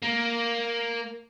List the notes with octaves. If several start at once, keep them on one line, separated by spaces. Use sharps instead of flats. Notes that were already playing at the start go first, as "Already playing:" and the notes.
A#3